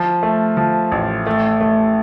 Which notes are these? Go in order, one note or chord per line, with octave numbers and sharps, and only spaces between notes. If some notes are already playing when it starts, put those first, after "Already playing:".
Already playing: F3
A3
F3
A1
A3
A3